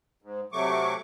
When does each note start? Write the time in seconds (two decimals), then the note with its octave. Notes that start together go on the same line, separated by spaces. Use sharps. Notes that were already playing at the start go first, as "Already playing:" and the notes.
0.22 G#2
0.52 C3 F#3 A3 C#6 D6